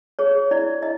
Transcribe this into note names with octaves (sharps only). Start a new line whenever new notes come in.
G#4 C#5
E4 D5
E4 D#5